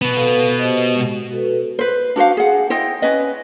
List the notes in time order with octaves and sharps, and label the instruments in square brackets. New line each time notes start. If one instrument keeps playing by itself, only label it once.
[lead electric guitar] B2 B3 [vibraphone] B5
[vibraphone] A4 B4 F5
G4 C5 D#5
G#3 F#4
F#4 A4 B4
[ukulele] B4 C5
D4 F#4 C5 F5
G#4 F#5
E4 C5 D#5 G5
C#4 B4 D#5